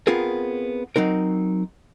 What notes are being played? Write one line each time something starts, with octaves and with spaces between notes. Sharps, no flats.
B3 C4 F4 G#4 A#4
F#3 C4 D#4 A#4